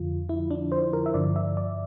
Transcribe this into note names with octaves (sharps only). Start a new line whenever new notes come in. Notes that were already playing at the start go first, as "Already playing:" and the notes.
Already playing: F2 D3 F3 F4
E4
D4
C5
A#4
E5
G2 D3 F3 D5
E5
D5